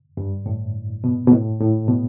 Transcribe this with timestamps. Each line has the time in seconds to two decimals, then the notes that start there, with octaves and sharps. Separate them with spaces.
0.17 G2
0.46 A2
1.04 B2
1.27 B2
1.32 A2
1.60 A2
1.88 B2